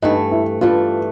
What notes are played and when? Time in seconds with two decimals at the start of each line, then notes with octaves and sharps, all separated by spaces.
0.02 G2 E3 A3 D#4
0.31 E4
0.61 G2 E3 A3 F4